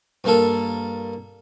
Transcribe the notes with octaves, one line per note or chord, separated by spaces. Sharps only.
G2 A#3 A4